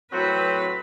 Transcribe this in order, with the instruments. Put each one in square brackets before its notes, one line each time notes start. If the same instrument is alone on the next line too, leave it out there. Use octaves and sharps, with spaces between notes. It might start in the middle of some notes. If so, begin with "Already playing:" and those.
[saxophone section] A2 F#3 [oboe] C4 [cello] B4